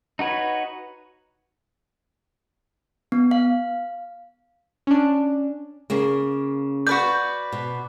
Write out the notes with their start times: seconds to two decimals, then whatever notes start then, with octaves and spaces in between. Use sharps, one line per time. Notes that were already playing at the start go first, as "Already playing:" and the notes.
0.19 D#4 F#4 B4 C#5
3.12 B3
3.31 F5
4.87 C#4 D4
5.90 C#3 A#3
6.87 F#4 B4 D5 G6
7.52 B2